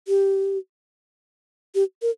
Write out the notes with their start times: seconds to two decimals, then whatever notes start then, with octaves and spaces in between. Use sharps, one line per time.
0.08 G4
1.75 G4
2.02 A#4